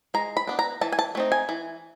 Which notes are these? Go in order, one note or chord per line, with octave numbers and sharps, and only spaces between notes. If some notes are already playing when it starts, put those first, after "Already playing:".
G#3 A#5
B5
B3 D4
A#5
E3 A5
G#5
A5
A3 C4 D#4
G#5
E3